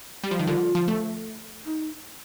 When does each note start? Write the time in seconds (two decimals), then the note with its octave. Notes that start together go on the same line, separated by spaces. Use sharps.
0.24 G3
0.31 F3
0.39 D#3
0.47 D3 F4
0.75 F3
0.88 A3
1.66 D#4